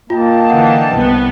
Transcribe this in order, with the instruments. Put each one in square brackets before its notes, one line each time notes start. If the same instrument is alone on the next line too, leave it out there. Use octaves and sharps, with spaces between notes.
[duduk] A#3 [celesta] F4 [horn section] D#5 G5 A5
[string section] D3 E3 [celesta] F#5
[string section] C2 B3